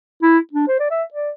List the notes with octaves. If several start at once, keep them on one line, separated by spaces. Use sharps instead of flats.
E4
D4
C5
D5
E5
D5